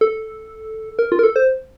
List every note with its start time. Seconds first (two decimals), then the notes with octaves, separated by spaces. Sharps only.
0.01 A4
0.99 A#4
1.12 F4
1.19 A#4
1.23 A4
1.36 C5